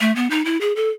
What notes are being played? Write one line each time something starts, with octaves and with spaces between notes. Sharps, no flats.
A3
B3
D#4
E4
G#4
A4